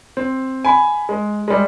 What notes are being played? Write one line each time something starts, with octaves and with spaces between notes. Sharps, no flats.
C4
G#5 B5
G#3
G3 G#3